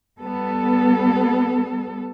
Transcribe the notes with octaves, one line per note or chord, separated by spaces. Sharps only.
G3 B3 A4